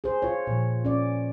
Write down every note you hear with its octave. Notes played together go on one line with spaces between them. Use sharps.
G#4 C5
F4 C#5
A#2 F3
C#4 D5